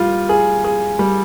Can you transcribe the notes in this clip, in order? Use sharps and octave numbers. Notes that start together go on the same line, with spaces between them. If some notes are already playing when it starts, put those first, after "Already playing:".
Already playing: G3 F4
G#4
G#4
G3